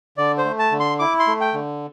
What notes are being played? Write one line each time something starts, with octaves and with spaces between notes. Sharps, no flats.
D3 D5
C5
A3
A5
D3
C6
E4 D6
C6
A3
G5
D3